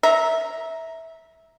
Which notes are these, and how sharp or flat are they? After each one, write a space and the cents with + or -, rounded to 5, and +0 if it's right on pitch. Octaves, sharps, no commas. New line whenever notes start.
E5 -15 A#5 +0